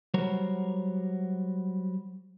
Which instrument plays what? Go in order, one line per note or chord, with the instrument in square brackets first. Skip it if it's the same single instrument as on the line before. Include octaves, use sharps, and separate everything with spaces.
[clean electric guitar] F#3 G3 F#4 A#4 C5 C#5